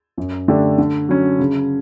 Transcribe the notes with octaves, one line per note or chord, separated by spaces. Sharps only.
F#2
D3 A3 D4 G4
D3
F#3 C#4
C#3